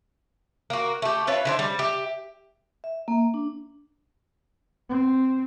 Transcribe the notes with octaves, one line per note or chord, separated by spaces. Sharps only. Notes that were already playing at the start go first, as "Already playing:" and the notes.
A#3 F#4
A3 G4
E4 F4 B4 C#5
D3 E4 C5
G3
G4 E5
E5
A#3
D4
C4